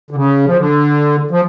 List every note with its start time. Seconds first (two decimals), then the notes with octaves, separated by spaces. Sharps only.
0.11 D3
0.16 C#3
0.46 F3
0.58 D3
1.31 F3